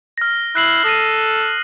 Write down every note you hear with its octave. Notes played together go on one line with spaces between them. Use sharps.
F6 A#6
E4 F#6 C7 F#7
A4 D#6 A#6 D#7